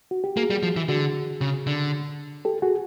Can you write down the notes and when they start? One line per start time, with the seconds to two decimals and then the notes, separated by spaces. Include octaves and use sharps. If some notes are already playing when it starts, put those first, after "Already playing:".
0.11 F#4
0.24 G4
0.36 A#3 F#4 G#4
0.50 G3
0.63 F3
0.76 E3
0.89 D3 F#4 G#4
1.41 C#3
1.67 D3
2.45 G4 A4
2.62 F#4 G#4